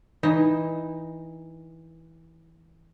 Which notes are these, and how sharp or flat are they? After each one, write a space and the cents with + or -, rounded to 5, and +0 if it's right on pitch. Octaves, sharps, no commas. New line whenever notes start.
E3 -15 D#4 +0